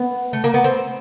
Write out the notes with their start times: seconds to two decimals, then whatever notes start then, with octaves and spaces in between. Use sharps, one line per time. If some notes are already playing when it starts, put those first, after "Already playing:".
Already playing: B3
0.33 A3
0.44 A#3
0.54 B3
0.64 C4